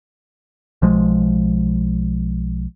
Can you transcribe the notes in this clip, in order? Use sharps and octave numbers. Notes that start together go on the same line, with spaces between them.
B1 F3 G#3